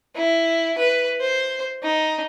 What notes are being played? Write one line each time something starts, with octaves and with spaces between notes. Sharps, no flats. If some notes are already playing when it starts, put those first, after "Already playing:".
E4
B4
C5
D#4